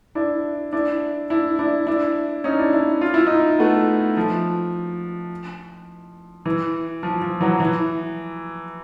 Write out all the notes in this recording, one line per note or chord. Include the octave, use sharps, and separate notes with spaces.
D4 E4
D4 E4
D4 E4
D4 E4
D4 E4
C#4 D#4
D4 E4
D4 E4
F4
E4
D#4 F4
A3 B3
F3
E3
F3
F3
E3 F#3
E3